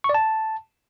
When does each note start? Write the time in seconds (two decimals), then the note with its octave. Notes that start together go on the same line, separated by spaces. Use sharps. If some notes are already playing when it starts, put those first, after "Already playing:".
0.04 C#6
0.09 D5
0.14 A5